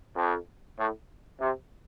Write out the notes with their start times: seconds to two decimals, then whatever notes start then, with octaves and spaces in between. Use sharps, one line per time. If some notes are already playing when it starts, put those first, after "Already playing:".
0.16 F2
0.79 A2
1.41 C3